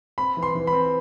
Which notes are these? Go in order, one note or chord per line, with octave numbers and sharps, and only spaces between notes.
C4 B5
E3
C6
E3
B5
C4